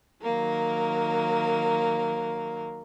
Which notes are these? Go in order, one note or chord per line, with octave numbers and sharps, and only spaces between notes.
D#3 F#3 A#3 A#4